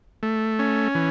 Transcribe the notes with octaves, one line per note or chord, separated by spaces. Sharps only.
A3
C#4
E3